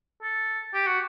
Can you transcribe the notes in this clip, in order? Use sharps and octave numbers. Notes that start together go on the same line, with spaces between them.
A4
G4
F#4